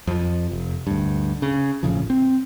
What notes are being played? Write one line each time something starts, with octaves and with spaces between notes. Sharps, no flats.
F2 F3
F1
D2 G2
C#3
G#1 A2 C#3 F3
C4